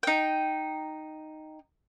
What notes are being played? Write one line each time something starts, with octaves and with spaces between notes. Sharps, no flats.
D#4 G5